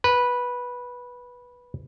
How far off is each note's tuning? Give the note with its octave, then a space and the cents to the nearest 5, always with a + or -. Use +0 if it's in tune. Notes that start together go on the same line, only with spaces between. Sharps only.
B4 -10